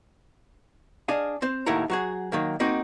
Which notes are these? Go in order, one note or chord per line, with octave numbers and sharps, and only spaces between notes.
D4 G#4 D#5 F5
C4 C5
D#2 A2 E4 A#4 F#5 A#5
F#3 F#4 G#4
D#3 F#3 A#3
A#3 C4 D#4 F#4